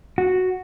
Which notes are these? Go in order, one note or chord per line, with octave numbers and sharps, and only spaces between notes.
F#4